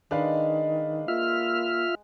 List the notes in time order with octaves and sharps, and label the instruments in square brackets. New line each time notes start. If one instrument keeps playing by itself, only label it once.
[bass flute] D#3 [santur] G#3 [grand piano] D4 B4 F5
[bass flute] A#3 [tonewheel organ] F4 E5 F6